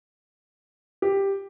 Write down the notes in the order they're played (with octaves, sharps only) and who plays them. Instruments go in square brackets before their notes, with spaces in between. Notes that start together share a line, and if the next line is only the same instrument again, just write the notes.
[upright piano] G4